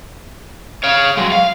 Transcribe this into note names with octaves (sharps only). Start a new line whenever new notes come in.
C#5 F5
F#3 G#3
F5